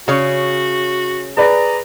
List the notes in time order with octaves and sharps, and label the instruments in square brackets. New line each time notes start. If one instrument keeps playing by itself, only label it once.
[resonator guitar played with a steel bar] C#3 C#5 [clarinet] F#4
[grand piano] G#4 B4 D5 [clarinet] A#5